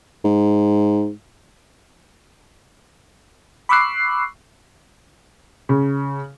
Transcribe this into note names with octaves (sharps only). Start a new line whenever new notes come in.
G#2
B5 C#6 D6 E6 F#6 C7
C#3